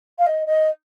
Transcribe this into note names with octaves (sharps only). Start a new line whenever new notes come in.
F5
D#5
D#5